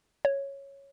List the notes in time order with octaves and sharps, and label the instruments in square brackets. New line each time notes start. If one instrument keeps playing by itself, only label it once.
[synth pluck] C#5